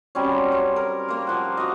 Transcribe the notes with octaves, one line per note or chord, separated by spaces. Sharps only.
F#3 G3 C4 C#4
C4 C#5
A#4
A#3 C5
F3 F#5
F#4 D#5